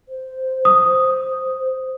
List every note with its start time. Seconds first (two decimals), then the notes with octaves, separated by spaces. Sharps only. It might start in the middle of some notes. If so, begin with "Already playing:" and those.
0.08 C5
0.65 D#6